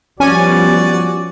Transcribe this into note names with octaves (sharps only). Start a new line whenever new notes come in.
F3 G3 B3 C#4 F#4 D5 G#5 D#7